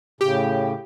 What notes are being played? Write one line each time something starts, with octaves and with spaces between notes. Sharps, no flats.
A2 C#3 G4